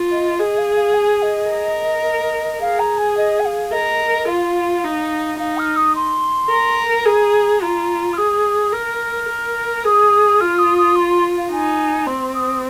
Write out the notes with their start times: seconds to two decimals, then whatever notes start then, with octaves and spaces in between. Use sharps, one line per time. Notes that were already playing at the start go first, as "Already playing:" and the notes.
Already playing: F4
0.11 D#5
0.38 G#4 D#5
0.58 F5
0.76 F5
0.94 G#5
1.22 D#5
1.50 A#4
2.61 G#4 F5
2.79 A#5
2.98 G#5
3.17 D#5
3.40 G#5
3.45 F5
3.72 A#4 D#5
4.28 F4 F5
4.84 D#4
5.39 D#4 F5
5.58 F6
5.76 D#6
5.95 C6
6.50 A#4
7.06 G#4 A#5
7.62 F4 A#5
8.13 F6
8.17 G#4 D#6
8.73 A#4 F6
9.29 A#4
9.84 G#4 D#6
10.40 F4 F6
10.58 D#6
10.78 D#6
10.96 C6
11.09 C6
11.37 F5
11.51 D#4 G#5
12.06 C4 C6
12.34 D#6